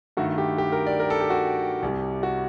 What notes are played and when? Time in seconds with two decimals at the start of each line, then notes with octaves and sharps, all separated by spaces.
0.17 G2 D#3 A3 F#4
0.38 G4
0.58 G4
0.72 A#4
0.87 D5
0.99 A#4
1.10 A4
1.21 G4
1.30 F#4
1.82 C2 C3 G3
2.23 F#4